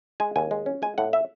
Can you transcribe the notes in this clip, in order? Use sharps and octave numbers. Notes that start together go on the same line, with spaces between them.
G#3 G#5
D#2 G#5
G#3
C#4
G#3 G#5
A2 F#5
E5